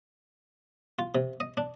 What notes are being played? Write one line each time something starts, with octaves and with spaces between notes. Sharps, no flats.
F4
C3
D#5
D4